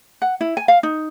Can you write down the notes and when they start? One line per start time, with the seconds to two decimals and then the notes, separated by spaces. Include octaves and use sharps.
0.22 F#5
0.41 E4
0.57 G#5
0.68 F5
0.83 D#4